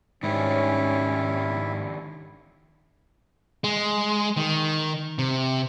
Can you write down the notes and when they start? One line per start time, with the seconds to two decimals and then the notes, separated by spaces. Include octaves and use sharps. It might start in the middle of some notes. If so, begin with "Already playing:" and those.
0.23 G#2 D#3 C#4 D4 E4 G4
3.64 G#3
4.37 D#3
5.19 C3